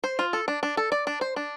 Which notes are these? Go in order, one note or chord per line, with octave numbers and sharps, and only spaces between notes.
C5
F4
A4
D4
D4
A4
D5
D4
C5
D4